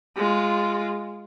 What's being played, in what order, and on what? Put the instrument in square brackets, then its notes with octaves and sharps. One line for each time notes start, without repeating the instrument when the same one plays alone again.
[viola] G#3 F4